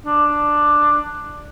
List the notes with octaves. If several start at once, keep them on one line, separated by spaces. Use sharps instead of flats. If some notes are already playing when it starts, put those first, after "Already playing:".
D4